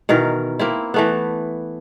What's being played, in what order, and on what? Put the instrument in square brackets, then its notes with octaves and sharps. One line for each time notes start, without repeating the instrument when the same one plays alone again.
[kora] B2 D#3 E3 A#4
A#3 C4 E4
E3 A3 B3